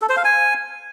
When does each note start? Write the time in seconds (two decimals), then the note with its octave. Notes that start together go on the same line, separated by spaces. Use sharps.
0.02 A4
0.09 C5
0.17 F5
0.25 G#5